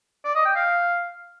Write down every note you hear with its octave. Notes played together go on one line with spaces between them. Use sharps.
D5
D#5
G5
F5